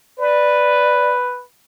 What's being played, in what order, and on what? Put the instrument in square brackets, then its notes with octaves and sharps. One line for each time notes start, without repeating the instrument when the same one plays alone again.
[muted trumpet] B4 [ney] D5